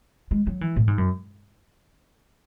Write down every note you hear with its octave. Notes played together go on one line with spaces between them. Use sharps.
G#3
F#3
E3
A2
G#2
F#2